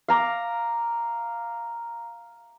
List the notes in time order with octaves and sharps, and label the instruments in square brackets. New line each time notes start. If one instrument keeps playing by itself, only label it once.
[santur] F5 A#5 D6